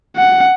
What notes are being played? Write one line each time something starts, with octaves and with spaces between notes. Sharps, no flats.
F#5